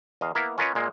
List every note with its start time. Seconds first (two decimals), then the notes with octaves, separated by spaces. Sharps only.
0.21 E2 D#5 F5
0.35 A#3 B3 E4 A#4
0.58 C#4 F4 A#4 B4 C#5 D#5
0.75 A#2 G#3 A#3